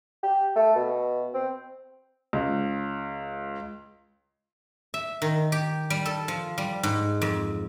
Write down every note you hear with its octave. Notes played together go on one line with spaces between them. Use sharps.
G4
A3
B2
C4
C#2
E5
D#3
G4
G3
A4
F3
G3
G#2
F2